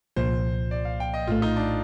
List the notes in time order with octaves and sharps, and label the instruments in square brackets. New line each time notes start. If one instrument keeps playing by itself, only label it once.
[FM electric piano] C2 A#2 F3 [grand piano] C5
[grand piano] D5
F5
G5
D#5
[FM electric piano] A#1 A2 A3 [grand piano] F4
[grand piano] D#4
D4